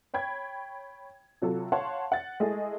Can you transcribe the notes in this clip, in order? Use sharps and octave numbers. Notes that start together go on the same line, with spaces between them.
C#5 G5 B5 G#6
C3 F#3 F4 A4
C#5 F5 F#5 A5 C6
F#5 A6
G#3 A3 E4 G#4 A4 D#5